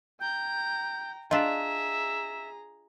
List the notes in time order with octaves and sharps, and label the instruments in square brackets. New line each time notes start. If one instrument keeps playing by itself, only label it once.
[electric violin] G5 A#5 [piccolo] G6
[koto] D4 F4 [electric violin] G#4 A#5 [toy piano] D#5 [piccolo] E5